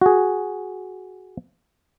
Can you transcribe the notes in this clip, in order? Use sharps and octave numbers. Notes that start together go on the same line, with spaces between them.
F#4 G#4